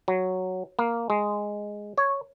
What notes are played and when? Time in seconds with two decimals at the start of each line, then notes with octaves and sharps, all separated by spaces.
0.08 F#3
0.79 A#3
1.10 G#3
1.98 C#5